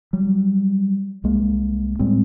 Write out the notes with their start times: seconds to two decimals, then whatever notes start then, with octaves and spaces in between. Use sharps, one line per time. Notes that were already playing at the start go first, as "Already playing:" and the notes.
0.13 F#3 G3
1.24 C2 G#3 A#3
1.99 A2 G3 G#3 C4